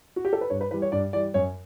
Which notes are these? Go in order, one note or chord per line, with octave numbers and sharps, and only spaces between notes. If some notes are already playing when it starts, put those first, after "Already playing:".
F#4
G4
A4
B4
G2 C#5
B4
E3 G3 B4
C#5
G2 D5
E3 G3 D5
F#2 C#5